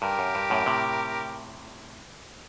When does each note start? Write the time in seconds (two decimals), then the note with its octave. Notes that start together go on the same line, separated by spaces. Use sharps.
0.02 G2 G4 A#4
0.19 F#2
0.35 G2
0.50 F#2 A2
0.66 A2 C3